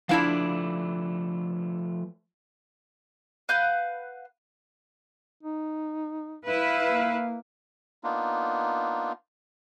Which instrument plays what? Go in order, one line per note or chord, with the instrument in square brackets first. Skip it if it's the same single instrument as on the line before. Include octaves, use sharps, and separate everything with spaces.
[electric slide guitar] F3 A3 B4 [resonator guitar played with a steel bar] D4 E4 F5
[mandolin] B4 F5 F#5 G6
[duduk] D#4
[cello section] E4 B4 [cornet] F5
[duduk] A#3
[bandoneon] A#3 B3 D4 D#4 F4